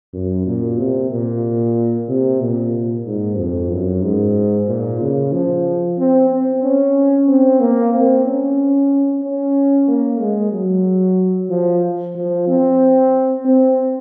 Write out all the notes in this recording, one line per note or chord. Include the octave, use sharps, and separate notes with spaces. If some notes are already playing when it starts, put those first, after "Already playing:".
F#2
A#2
C3
A#2
C3
A#2
G#2
F2
F#2
G#2
A#2
C#3
F3
C4
C4
C#4
C4
A#3
C4
C#4
C#4
A#3
G#3
F#3
F3
F3
C4
C4